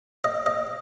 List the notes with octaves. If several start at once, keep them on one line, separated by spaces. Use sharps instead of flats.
D#5
D#5